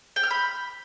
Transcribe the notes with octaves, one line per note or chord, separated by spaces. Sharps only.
G5
F6
B5